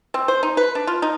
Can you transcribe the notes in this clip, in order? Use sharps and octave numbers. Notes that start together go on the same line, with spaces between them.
C4
C5
D#4
B4
D4
F4
D#4